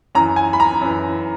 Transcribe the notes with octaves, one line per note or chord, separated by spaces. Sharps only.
F#2 E3 A#5
G#5
B5
A#5
F#2 E3